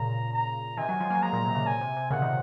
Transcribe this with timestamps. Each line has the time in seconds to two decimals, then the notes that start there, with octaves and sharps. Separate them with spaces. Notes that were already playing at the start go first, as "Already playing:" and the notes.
Already playing: A#2 C#3 A#5
0.33 A#5
0.77 C3 D#3 G#5
0.88 D#3 F#3
1.00 F3 G#3
1.11 F#3 A#3
1.22 F3 G#3 A#5
1.33 A#2
1.45 C3
1.55 A#2 C#3
1.66 A#2 G#5
1.81 C3
1.96 C3
2.11 A#2 C#3 F#5
2.22 C3 D#3